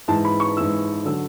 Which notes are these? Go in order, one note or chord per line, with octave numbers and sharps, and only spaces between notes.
G#2 E3 A5
B5
C#6
G#2 E3 E6
D3 F#3 E6